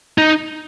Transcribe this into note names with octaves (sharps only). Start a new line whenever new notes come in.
D#4